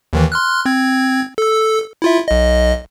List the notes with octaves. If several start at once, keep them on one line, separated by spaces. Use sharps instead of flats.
D#2 D#3 E3
C6 F6 F#6
C4 G#6
A4 E6
E4 F4 E5
B1 D#5